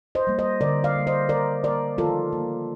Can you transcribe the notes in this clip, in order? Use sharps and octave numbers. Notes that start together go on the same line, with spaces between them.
C5 D#5
G3 A#3
C5 D#5
D3 A#4 D5
D5 F5
G3 A#3
C5 D#5
D#3 A#4 D5
A#3 A#4 D5
D#3 F4 A4
A#3